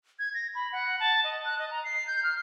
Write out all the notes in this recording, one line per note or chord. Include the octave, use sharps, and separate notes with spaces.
G#6
A#6
B5
F#5
A5
D#5
F#6
D#5
A#5
C7
G6
F6